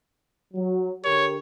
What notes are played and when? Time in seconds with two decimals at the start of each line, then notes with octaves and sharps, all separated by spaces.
0.54 F#3
1.04 D3 G4 A#4 C#5